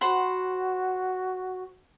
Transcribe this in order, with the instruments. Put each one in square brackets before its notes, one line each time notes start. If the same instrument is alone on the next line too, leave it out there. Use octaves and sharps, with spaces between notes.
[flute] F#4 [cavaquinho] C5 F#5 B5